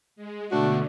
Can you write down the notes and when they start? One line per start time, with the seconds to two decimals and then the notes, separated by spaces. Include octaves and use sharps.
0.16 G#3
0.51 B2 D3 A3 D4 F#4